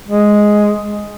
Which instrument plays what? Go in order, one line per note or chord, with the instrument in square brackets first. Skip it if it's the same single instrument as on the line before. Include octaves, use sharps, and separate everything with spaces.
[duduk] G#3